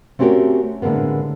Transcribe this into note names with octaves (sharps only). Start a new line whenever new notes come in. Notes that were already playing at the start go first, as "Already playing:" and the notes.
A3 C4 C#4 F#4 G4 A#4
A2 D3 G#3 A#3 B3